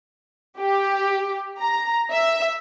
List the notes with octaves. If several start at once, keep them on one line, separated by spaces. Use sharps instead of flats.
G4
A#5
E5